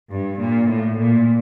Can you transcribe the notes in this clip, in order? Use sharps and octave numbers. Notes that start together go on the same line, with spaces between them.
G2
A#2
A2
A#2